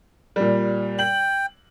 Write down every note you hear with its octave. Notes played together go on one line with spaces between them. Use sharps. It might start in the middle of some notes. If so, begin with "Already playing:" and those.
A#2 G3
G5 F#7